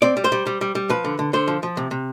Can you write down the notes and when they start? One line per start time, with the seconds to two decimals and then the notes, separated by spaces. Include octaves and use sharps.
0.02 C4 D5
0.17 G3
0.24 C5
0.32 G3
0.47 G3
0.61 G3
0.75 G3
0.90 F3 B4
1.05 D3
1.19 D3
1.33 D3 C5
1.48 F3
1.63 F3
1.77 C3
1.91 C3